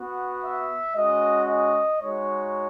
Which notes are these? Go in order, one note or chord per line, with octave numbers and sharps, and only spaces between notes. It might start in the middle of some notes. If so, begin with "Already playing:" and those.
Already playing: B3 F#4
E5
G#3 C#4 F#4 D#5
D#5
G#3 D#4 F#4 C#5